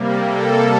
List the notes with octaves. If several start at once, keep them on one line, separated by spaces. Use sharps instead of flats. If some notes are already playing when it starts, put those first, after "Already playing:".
Already playing: C3 G3 A#3
A4